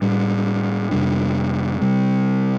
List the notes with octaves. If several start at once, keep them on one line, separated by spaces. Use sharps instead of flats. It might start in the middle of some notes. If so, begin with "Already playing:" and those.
A2 G3 D4
F2 C3 G3 D4
C3 G3 C4